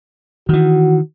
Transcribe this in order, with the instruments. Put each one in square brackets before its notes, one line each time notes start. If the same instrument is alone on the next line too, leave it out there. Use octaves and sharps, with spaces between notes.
[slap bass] D#3 E3 [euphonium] F#4